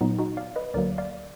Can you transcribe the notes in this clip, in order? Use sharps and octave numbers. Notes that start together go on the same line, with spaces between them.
A#2 F#3 B3 D#4
D#4 F#4
D5 F5
B4 D#5
D2 D3 F#3 A#3 A#4 D5
D5 F5